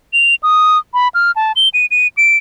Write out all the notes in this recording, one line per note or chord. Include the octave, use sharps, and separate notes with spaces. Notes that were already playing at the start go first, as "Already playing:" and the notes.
F7
D#6
B5
F6
A5
G7
D#7
D#7
D7